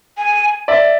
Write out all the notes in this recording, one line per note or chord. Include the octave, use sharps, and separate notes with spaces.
G#5
D5 E5